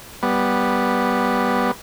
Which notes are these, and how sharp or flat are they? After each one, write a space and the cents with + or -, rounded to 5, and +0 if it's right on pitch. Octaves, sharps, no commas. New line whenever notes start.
G3 +0 B3 -5